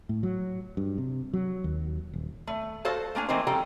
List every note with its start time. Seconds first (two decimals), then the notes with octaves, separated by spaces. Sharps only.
0.09 A2
0.23 F#3
0.77 G2
0.98 C3
1.34 F#3
1.64 D#2
2.14 D#1
2.47 A3
2.85 F#4 A4 C5 F5 A5
3.15 A3 A#3 D4 G#5
3.29 E3 A3 A#3 C4 D#4 C5
3.47 C#3 F3 G3 A4 G5 A#5